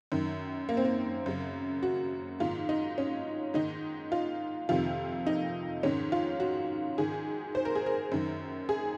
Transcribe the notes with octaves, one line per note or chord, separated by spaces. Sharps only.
F#2 D#3
A#3
C4
A#3
F#2 C#3
F#4
G#2 D#3 F4
D#4
C#4
G#2 D#3 D#4
F4
F2 C3 D#3 F4
D#4
G#2 D#3 C#4
F4
F#4
G#2 D#3 G#4
C5
A#4
G#4
A#4
F#2 D#3
G#4